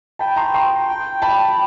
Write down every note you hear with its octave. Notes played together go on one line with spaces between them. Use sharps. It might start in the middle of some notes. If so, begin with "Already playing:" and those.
G5 A5 B5
A#5 C6
A#5 C6
G5
A5 B5